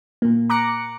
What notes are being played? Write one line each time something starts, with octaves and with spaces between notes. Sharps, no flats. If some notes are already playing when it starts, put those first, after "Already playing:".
A#2 A#3
A#5 D6 F#6 A#6 C#7